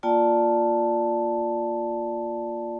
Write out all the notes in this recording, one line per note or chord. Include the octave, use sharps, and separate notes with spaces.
A#3 F4 D5 G5 A5